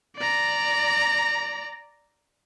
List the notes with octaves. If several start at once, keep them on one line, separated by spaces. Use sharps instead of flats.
D5 A#5